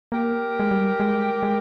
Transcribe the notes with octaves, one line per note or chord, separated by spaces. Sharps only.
A#3 G4 A#4
G#3
G3
G#3
G#3